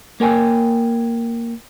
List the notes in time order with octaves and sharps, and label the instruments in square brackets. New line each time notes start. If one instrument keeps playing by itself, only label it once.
[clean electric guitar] A#3 A#4 G5 G#5